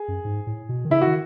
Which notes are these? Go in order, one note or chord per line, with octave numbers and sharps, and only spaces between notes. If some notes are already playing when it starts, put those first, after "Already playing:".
Already playing: G#4
F#2
G#2
A2
B2
D#3
C#3 E4
F#4
D#3